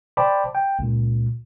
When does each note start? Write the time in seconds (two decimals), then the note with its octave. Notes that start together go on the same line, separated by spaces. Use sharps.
0.17 C5 D5 G5 A5 B5 D6
0.55 G5
0.79 C#2 A#2